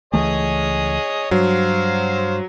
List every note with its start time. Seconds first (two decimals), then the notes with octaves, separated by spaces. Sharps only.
0.13 C#2 E3 A3 G#4 C#5 D#5
1.31 G2 F#3 C5 F5